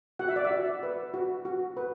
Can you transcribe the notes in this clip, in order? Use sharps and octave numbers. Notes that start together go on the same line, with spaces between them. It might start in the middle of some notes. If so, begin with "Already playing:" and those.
F#4 F#5
E5
D5
E5
F#4
B4
F#4
F#4
B4